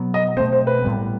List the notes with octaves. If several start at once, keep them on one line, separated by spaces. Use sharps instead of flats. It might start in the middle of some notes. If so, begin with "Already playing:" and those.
Already playing: B2 F#3 B3
D#5
B2 A3 C4 C5
C5
B4
A2 G3 B3